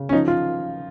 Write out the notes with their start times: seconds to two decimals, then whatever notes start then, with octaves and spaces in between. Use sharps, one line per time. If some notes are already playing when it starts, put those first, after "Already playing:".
Already playing: C#3
0.09 C#4
0.13 F3 D#4
0.28 F4